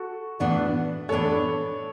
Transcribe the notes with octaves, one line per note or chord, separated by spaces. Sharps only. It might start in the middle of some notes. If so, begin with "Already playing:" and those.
Already playing: F#4 A4
A2 E3 B3 D4 D5 F#5
A2 E3 B3 D4 A4 C#5